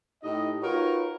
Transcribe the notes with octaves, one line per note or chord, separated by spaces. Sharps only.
A2 D#4 G4 D#5
D#4 F4 F#4 A#4 B4 C#5